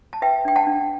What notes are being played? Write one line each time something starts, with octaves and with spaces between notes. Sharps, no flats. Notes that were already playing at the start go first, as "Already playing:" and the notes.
A5
B4 E5 G5
D4 G5
F#5 A5
D4